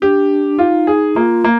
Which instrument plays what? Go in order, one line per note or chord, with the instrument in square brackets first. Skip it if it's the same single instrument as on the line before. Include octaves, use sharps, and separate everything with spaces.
[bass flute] D4 [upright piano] G4
[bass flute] D#4 [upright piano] F4
[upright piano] G#4
[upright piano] A#3 [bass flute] F4
[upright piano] A#3